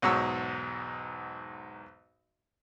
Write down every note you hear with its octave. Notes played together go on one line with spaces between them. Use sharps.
B1 E2 G#2 F#4 C#5 E6